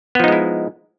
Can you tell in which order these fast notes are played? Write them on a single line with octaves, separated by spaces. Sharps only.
B3 F3 D#4 G#3 E4